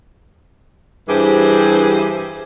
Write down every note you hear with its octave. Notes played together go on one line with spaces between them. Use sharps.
G2 E3 G4 G#4 C5